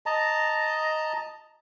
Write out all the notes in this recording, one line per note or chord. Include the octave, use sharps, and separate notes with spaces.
D#5 A5 A#5